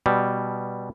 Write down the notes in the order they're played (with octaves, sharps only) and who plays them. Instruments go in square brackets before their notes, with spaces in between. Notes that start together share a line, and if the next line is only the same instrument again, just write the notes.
[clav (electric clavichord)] B2 G3